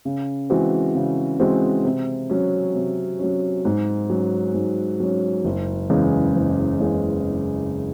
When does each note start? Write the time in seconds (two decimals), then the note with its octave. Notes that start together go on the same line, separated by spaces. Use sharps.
0.05 C#3
0.50 E3 G#3 C4 F#4
0.95 C#3
1.40 E3 G#3 C4 F#4
1.85 C3
2.30 F#3 C#4
2.75 C3
3.19 F#3 C#4
3.65 G#2
4.10 F#3 C#4
4.54 G#2
5.00 F#3 C#4
5.44 F#1
5.90 E2 C#3 G#3
6.35 F#1
6.80 E2 C#3 G#3